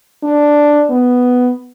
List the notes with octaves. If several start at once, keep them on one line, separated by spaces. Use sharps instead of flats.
D4
B3